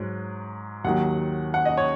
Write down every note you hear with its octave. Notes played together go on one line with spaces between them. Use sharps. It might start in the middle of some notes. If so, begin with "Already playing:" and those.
Already playing: G#2 F#3
D#2 D#3 F#3 F#5
F#5
D#5
C#5